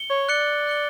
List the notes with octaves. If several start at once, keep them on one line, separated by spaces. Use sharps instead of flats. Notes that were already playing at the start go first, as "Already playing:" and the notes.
Already playing: C#7 G7
C#5
D5 F#6 C#7 G7
F#6 C#7 G7